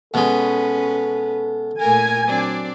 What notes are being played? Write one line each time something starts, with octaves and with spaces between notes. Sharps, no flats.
B2 G#3 C#4 A4 B4
A#2 A3 A#4 G#5
F#3 C4 D4 D5